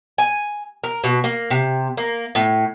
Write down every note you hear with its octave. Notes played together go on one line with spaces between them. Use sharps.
G#5
A#4
B2
A#3
C3
A#3
A2